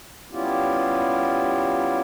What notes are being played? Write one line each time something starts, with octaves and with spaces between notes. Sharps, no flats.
G3 B3 C#4 E4 F4 G4